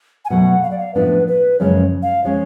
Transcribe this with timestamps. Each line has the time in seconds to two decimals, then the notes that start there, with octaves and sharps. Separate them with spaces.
0.25 G#5
0.30 B2 F#3 A3 F#5
0.63 F5
0.71 D5
0.78 F5
0.94 A2 F3 B3 D4 B4
1.28 B4
1.59 F#2 C#3 F3 G#3 C#4 C#5
2.02 F5
2.24 F3 G#3 C#4 C#5